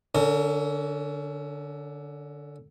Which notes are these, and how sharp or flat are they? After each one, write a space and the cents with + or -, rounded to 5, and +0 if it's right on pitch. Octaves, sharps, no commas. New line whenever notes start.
D3 +0 C#4 +30 A#4 -30